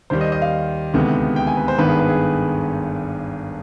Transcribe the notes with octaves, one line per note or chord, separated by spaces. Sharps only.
D#2 D#3 G3 C5
D#5
D#5
F5
D2 C3 D#3 G#3 B3
G5
G#5
B4
C5
G#1 G2 D#3 B3 B4
G#4
B4
G#4